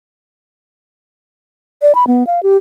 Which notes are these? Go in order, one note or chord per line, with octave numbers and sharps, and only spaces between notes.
D5
B5
B3
F5
G4